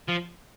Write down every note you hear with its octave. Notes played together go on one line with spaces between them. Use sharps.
F3